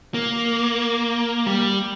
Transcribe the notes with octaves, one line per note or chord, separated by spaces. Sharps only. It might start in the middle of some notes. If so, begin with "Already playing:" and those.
A#3
G3